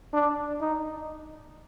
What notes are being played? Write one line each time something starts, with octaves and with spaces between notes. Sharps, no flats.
D4
D#4